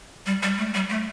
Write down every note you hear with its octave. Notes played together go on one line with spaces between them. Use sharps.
G3
G3
A3
G3
A3